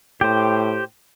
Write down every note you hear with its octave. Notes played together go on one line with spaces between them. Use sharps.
A2 G4 C5